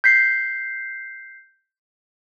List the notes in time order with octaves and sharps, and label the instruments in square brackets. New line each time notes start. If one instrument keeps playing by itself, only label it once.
[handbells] G6 B6 C7